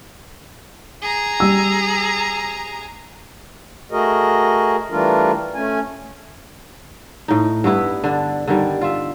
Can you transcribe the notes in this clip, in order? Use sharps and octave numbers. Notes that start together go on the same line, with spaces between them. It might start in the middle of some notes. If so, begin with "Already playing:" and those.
G#4 A#5
G3 E6
A3 F#4 G#4 A#4 D#5
E3 G3 A3 D4 F4 A#4
A3 C#4 G#5
A2 D#4
G2 B3 E4 B4
D3 D4
D3 D#3 G3
F4 E5